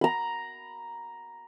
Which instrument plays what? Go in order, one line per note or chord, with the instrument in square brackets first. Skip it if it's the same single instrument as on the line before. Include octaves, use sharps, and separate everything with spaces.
[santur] A#5 B5